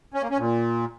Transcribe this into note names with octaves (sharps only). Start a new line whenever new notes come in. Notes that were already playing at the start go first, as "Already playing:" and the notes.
C#4
A#3
C#4
A#2